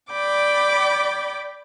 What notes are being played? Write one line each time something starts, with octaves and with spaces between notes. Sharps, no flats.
D5 G5 B5 D6